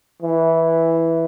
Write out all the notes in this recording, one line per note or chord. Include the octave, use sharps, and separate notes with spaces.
E3